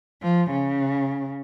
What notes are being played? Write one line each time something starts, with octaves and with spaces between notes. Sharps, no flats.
F3
C#3